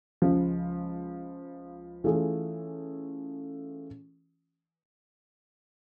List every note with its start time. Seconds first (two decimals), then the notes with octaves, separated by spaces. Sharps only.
0.22 C#2 C#3 F3
2.04 E3 A3 C#4 F4 G#4